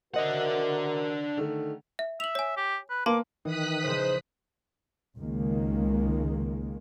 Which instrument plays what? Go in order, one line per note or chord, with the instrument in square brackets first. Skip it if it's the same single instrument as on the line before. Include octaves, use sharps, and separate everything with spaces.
[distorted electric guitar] D4 F#5 [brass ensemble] F#4 A#4 [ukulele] C5 D#5 E5
[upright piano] D3 D#3 A3
[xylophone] E5
[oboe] E5 [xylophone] F7 F#7
[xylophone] C#5 G#5
[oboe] G4
B4
[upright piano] A#3 [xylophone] B4 A5 C6 [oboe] D6
[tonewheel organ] D#3 [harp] E3 [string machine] D#6 F#6 B6
[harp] A#1 C#3 D#7 [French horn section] D#4 G#4 C5
[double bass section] C#2 D#3 G#3 A#3